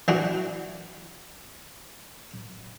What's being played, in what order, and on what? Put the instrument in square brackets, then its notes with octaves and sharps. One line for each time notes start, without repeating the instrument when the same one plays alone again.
[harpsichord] E3 D4 F#4